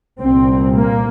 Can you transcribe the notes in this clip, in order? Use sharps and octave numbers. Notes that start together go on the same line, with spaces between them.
C2 A#2 C4
A#3